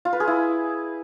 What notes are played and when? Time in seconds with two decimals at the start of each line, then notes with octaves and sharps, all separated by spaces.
0.05 F4
0.13 B4
0.20 G#4
0.28 E4